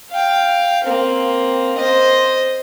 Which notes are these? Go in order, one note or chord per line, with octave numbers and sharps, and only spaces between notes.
F5 G5
A#3 C4
C5 D#5